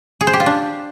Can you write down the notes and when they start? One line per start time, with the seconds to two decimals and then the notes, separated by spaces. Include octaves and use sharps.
0.21 G#4
0.27 C5
0.33 G4
0.40 F4
0.46 D4